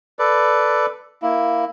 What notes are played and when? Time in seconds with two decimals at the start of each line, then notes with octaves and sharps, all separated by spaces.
0.19 A4 B4 D5
1.22 A#3 E4